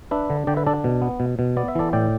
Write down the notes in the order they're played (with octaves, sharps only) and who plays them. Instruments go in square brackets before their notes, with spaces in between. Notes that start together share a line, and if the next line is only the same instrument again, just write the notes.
[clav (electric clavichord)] D4 B4 E5
D3
D3 D5 G5
B4 E5
D4 A4 D5
B2
B3
B2
B2
B3 D5
E5
E3 A4 D5
A2 D5 G5